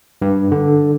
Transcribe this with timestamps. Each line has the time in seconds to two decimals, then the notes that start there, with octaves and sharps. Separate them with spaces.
0.22 G2
0.52 D3